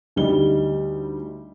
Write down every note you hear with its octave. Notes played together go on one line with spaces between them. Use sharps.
D2 G3 D#4 G7